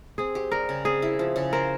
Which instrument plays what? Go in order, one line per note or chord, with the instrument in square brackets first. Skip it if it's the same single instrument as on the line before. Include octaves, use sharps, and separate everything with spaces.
[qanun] C4 [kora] G#4
[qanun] G4
[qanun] G3 [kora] A#4
[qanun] C#3
[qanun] C4 [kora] G#4
[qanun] E4
F3
C#3
[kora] A#4 [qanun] C5